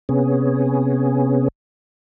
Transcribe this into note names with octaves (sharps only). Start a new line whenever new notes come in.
C3 B3 C#4 G#4